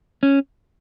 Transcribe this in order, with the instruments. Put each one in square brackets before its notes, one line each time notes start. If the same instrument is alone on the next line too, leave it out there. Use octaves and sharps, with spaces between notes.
[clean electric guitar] C#4